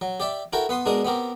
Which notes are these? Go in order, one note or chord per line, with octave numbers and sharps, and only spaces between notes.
F#3
G4 D5 E5
E4 F#4 A4 A#4 G5
B3 B4 C6 D#6
B2 G#3 D4 G#4 A#4 D#6
B3 C4 G4 A#4